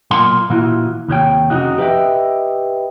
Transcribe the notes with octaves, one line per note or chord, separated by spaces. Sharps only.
B1 A#2 A#3 C6
A#2 E3 F4 F#4
D#2 C3 C#5 G5
F2 C#3 D#4 F#4
G4 B4 C5 D#5 E5 G5